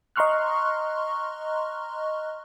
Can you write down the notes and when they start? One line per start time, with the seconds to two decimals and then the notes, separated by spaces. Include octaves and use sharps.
0.16 D#5 A#5 C6 C#6 F6 F#6